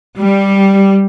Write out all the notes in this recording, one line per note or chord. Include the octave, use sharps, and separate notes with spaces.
G3